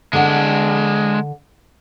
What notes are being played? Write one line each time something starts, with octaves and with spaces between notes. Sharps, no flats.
D3 G#3 D4 F#5